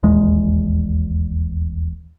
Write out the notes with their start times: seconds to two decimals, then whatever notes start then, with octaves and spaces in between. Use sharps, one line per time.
0.03 D#1 A#1 E2 G#3